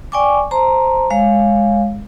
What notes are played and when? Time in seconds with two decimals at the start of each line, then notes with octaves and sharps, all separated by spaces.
0.12 D5 G5 G#5 C#6 D6
0.51 C5 A5 A#5 C6
1.10 G#3 C#5 F5